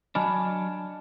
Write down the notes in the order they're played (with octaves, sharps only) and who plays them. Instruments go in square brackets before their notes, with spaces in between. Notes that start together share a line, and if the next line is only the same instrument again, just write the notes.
[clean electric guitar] F#3 D4 [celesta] D#5 G#5 F6 [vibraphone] A5 [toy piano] B5